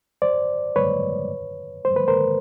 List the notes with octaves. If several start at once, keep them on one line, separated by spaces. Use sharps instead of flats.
C5 D5
B4 C#5
C5
B4
A#4 C5